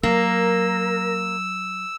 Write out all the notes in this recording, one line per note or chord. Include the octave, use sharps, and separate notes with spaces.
F#3 A#3 A#4 E6